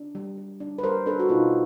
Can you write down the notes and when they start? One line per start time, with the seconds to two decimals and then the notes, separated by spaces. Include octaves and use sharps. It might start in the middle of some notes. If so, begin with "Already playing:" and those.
Already playing: D4
0.15 G3
0.38 G3
0.60 D4
0.78 B4
0.83 G3 A#4 C5
1.06 D4 A4 B4
1.20 F#4
1.29 B2 D#4 F4